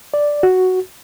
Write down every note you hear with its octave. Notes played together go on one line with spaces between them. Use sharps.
D5
F#4